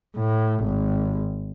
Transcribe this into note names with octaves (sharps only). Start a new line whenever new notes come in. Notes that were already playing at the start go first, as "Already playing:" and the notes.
A2
G#1